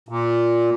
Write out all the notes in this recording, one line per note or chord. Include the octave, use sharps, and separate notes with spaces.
A#2